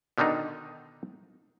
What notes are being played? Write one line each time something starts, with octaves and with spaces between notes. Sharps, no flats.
B2 D3 D#3 D4 D#4